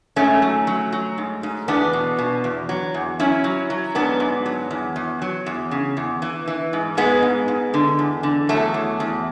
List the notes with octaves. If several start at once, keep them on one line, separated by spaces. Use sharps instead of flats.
G#2 A3 C#4
F#3
F#3
F#3
G#2
G#2
E2 B3 D4
B2
B2
E2
F#3
E2
F#3 C#4 E4
F#3
F#3
G#2 B3 D4
G#2
F#3
E2
E2
F#3
E2
C#3
E2
E3
E3
G#2
G#2 G#3 B3
G#2
G#2
D3
E2
D3
E2 F#3 A3
E2
E2